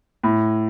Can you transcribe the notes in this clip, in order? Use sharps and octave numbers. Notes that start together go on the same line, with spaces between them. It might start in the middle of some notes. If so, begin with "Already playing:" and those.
A2